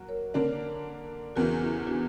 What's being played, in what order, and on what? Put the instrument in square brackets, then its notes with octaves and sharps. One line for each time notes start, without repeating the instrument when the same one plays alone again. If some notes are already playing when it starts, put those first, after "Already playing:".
Already playing: [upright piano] F#3 A#3 F#4
[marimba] A#4 C#5
[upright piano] D3 A#3 D4 [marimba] A#4 C#5
[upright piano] E2 C#3 E3 [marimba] F#4 A#4
[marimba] E4 G4
E4
D4 F#4